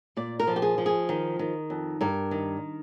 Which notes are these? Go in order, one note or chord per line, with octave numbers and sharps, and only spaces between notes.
A#2 D5
A#4
F3
G4
G#4
F3
G#4
D#3
D#3
F2
G2 A#4
D#3